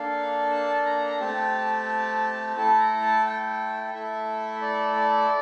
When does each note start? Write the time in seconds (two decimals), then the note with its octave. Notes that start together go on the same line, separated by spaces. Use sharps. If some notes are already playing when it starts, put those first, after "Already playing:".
Already playing: A#3 D4 A4 F5
0.51 A5
0.86 A#5
1.20 A3 C4 G4 A5
2.56 A3 E4 A4 A5
2.79 A#5
3.02 A5
3.25 G5
3.93 A3 E4 A4 E5
4.61 D5
4.96 D5